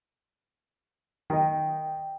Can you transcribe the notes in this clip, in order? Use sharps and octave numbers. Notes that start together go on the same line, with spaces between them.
D#3 D#5 G5